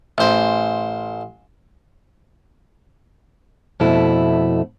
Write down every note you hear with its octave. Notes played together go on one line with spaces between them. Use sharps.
A1 C5
F2 B2 A3 E4